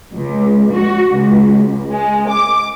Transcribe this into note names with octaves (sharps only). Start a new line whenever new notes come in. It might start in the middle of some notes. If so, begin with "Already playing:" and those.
C#2
F#4
C#2
G#3
D6